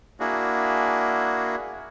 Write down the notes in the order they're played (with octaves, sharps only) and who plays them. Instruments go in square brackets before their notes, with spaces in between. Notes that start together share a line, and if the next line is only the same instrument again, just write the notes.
[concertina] A#3 D4 E4 F#4 G#4